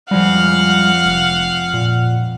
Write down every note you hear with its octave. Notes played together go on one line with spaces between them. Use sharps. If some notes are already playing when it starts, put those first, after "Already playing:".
F2 F3 G3 G#3 F5 F#5
F1
A#2